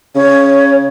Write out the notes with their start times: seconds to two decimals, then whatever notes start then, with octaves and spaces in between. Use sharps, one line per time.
0.15 C#3 C#5